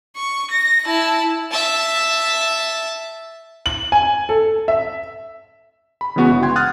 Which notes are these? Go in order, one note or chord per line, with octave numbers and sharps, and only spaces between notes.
C#6
A#6
E4 A5
E5 A5
F#7
G#5
A4
E5
B5
C#3 E3 G#3 B3 F#4
G1 F#4
G5 C6 G#6
F#5 D#6 F6 F#6 A6